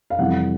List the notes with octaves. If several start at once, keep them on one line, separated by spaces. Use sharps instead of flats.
F5
F2 C3 E3 G3 F#5